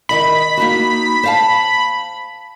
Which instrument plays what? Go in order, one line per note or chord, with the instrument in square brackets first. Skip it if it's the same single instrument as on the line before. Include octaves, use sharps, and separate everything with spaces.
[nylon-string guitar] D#3 D#5 E5 [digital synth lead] B5
[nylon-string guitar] A#3 D#4 F#4
C5 F5 A5